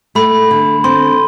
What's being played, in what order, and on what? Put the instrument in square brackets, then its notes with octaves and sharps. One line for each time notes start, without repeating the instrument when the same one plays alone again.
[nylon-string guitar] A3 [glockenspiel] B5
[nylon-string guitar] D3
[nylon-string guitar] C4 [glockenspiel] C6